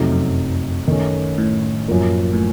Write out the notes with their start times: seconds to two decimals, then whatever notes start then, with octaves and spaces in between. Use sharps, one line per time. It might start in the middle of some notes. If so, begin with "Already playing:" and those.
Already playing: F2 C3 F#3 A3 D#4
0.12 F#2
0.88 D#3 A3 C#4
1.38 A2
1.88 F#2 F3 A#3
2.33 A2